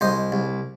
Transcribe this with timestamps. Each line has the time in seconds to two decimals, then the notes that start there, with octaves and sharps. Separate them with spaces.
0.01 C2 C5 D#5
0.32 C2